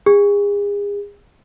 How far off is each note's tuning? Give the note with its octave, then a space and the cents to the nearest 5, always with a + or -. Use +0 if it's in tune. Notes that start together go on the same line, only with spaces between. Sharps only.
G#4 -35